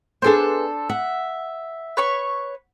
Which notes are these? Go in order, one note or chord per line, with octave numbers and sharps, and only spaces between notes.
B3 D4 G#4 A4 C5
E5 F#5
B4 C#5 C#6